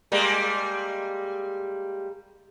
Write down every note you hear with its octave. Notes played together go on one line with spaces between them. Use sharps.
G3 G#3 A#3